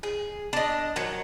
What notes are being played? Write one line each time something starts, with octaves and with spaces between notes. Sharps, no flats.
G#4
D4 D#5
D#3 F#3